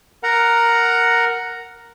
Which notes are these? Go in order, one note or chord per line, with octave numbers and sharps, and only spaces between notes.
A#4 F#5 A#5